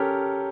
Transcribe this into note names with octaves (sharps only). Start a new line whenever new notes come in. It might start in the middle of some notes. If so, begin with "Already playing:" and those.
Already playing: C#4 G4 A4 A#4